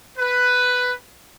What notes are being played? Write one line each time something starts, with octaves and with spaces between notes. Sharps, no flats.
B4